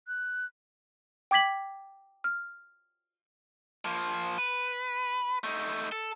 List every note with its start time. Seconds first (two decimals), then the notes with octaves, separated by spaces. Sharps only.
0.08 F#6
1.31 G5 D6 G#6 B6 F#7
2.24 F6
3.85 F3 A#3
4.38 B4
5.44 A3 D#4
5.92 A4